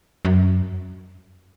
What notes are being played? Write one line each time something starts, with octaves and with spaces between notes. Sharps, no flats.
F#2